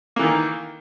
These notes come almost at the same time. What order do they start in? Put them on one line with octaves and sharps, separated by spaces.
A#3 E3 D#3